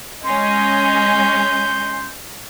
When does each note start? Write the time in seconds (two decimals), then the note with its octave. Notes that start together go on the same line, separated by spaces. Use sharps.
0.24 G#3 C#4 D#5 C6 G6